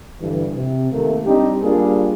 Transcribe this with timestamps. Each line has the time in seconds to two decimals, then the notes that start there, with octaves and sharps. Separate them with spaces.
0.21 G2 D3 E3
0.55 C3
0.92 C3 D#3 A3 A#3
1.25 G3 C4 D4 D#4 G4
1.63 G3 A#3 D4 F4 G#4